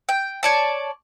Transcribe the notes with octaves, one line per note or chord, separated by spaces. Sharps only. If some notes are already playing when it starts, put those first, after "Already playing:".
G5
C#5 D5 A5